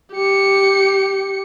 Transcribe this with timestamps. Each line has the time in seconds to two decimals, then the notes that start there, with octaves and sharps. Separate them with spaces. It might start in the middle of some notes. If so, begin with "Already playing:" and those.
0.14 G4 C#7